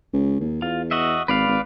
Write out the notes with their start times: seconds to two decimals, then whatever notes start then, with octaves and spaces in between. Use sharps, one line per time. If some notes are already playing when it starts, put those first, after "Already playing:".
0.13 C#2
0.40 D#2
0.62 E2 F4
0.91 F#4 D#5 E5
1.28 G#1 B4 D5 F5
1.47 G#1